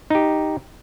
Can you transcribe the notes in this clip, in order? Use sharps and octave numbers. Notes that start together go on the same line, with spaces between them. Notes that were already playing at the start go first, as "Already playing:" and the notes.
D#4 G4